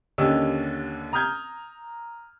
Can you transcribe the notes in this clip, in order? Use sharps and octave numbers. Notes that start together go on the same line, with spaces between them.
D#2 D3 C#4 G4 D#5 E6
A#5 D#6 F6 G6 G#6